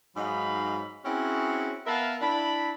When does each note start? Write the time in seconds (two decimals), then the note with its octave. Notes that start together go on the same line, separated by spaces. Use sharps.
0.16 G#2 F#3 D#4 F5 B5
1.05 C4 C#4 E4 F#4 G#4
1.87 B3 A#4 E5 F5 A5 B5
2.22 D4 E4 B5